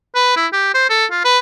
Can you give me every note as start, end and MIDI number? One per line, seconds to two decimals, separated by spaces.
0.15 0.36 71
0.36 0.47 64
0.53 0.74 67
0.74 0.87 72
0.90 1.06 69
1.11 1.24 65
1.25 1.39 71